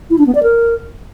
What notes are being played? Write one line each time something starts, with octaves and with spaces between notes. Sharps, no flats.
E4
D4
B3
D5
A#4